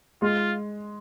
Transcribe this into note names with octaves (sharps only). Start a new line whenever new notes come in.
G#3 F4